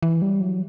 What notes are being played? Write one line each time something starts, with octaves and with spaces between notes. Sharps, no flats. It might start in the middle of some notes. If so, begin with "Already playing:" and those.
E3
G3
F#3